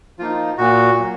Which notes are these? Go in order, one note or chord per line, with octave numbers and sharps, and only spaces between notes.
F3 A#3 D#4 F4
A#2 F#4
F#3 A#3